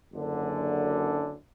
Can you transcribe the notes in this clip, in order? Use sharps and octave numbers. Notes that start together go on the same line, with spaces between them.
F#1 F#2 D3